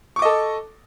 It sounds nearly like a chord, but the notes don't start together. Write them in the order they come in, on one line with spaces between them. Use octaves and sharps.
C#6 D6 D#5 A4